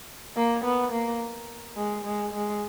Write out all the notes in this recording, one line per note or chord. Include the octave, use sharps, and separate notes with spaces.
A#3
B3
A#3
G#3
G#3
G#3